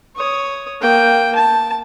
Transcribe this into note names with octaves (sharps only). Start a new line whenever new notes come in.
C#5 D#6
A#3 G5
A5